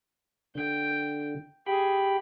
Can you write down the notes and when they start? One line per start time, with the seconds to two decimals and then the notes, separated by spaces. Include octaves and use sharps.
0.55 D3 G5
1.66 G4 G#4 G5 B5